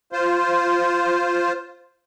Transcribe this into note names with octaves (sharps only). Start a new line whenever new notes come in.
F4 C5